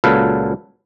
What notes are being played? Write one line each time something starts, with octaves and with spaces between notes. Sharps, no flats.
C#2 A#2 F#3 A4 B4 F5